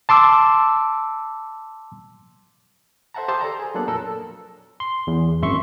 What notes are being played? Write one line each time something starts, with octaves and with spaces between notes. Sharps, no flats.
A5 C6 D6 E6
A4 C5 E5 F#5 A5 A#5
G4 C5 F5 A5 D#6 E6
A4 D5 A#5
G#4
F#3 A#3 B3 D4 A4 F#6
F2 A#2 A4 A#4 E6
C6
E2
G#1 F#2 E5 C6 C#6